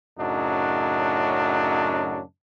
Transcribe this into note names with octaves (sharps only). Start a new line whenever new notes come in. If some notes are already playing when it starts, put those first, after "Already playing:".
F#2 A2 C#3 F#3 D4 D#4